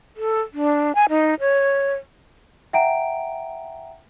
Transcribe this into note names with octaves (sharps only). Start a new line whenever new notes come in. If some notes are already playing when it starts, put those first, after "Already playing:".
A4
D4
G#5
D#4
C#5
E5 F#5 G5 A#5 D7